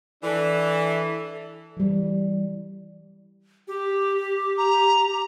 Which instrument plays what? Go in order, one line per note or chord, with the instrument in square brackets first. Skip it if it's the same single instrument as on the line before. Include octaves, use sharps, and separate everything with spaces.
[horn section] E3 [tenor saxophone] D4 [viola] A4
[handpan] E3 G3
[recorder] G4
[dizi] A#5